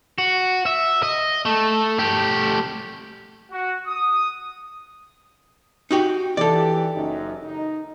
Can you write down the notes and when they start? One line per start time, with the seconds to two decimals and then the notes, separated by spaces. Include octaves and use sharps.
0.18 F#4
0.66 E5
1.03 D#5
1.45 A3
1.99 A3 G4
3.51 F#4
3.87 D#6
5.91 D#4 F#4 G4
6.37 E3 G4 A4 D5
6.95 F#1 F#2 D#4
7.43 D#4